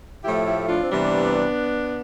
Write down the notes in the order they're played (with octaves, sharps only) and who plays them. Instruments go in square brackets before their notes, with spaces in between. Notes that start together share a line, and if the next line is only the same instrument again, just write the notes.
[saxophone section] A2 F3 A3 E4 G4
E4 G4
D4 F4
C4
C3 E3 G3 B3 D4